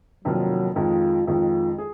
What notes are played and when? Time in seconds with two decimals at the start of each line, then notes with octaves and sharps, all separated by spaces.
0.24 F1 F2 D#3 F#3 A#3 F4
0.76 F2 D#3 G#3 F4
1.27 F2 D#3 G#3 F4
1.78 G#4